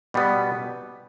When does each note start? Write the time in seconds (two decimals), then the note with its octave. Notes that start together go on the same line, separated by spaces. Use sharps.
0.14 B2 G3 B3